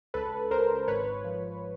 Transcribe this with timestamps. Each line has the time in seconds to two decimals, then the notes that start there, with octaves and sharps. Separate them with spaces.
0.14 C#2 A4 B4
0.51 C#2 A#4 C5
0.88 G#1 B4 C#5
1.24 F3